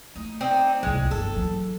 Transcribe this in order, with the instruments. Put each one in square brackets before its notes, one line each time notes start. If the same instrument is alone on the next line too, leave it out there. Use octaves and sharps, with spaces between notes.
[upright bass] A3 [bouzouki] D#4
[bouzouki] C4 D4 D#4
[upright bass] C2 F2 [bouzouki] G#3
[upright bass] G1 [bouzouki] A4
[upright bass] E3 F#3